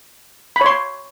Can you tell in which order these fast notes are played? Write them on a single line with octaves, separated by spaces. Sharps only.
B5 C#5 C6